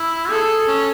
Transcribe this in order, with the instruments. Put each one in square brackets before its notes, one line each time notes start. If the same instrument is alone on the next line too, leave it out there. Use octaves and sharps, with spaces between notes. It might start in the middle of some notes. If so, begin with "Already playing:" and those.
Already playing: [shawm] E4
[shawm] G#4 [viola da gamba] A4
[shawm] C#4